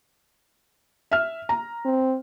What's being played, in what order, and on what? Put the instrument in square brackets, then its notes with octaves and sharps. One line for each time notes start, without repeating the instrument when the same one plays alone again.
[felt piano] E5 F6
A#5
[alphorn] C4